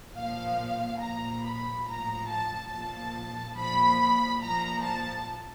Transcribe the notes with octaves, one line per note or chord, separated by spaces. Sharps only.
A#2 F3 F5
A#2 F3 A#5
B5
A2 F3 A#5
A5
A#2 F3 A5
A#2 F3 B5
A#2 F3 A#5
A5